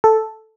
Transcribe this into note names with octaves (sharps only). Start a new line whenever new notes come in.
A4